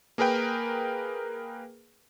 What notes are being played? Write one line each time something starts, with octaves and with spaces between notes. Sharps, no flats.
A#3 G#4 A#4 B4 G5